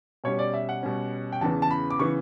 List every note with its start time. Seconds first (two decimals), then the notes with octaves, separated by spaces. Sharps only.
0.24 B2 G3 C#4 C#5
0.39 D5
0.54 E5
0.69 F#5
0.83 B2 G3 C#4
1.32 G5
1.41 E2 C#3 E3 B3 A5
1.62 A5
1.71 B5
1.90 D6
1.99 C#3 E3 B3 C#6